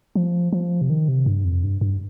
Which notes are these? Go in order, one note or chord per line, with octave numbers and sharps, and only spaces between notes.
F3
F3
C3
D#3
C3
G2
F2
G2
G2